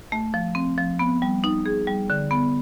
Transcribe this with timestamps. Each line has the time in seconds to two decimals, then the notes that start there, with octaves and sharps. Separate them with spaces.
0.12 A3
0.34 F3
0.55 C4
0.78 F3
0.99 B3
1.22 G3
1.44 D#4
1.66 G#4
1.87 G3
2.10 D3
2.31 B3